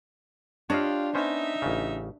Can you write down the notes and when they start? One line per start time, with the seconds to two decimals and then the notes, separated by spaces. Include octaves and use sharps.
0.70 D4 F4 G4 C#5 D#5 F5
1.15 B3 C#4 D#4 C5 E5
1.62 A1 C#3